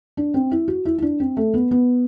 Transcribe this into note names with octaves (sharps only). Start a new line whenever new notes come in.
D4
C4
E4
F#4
E4
E4
D4
C4
A3
B3
B3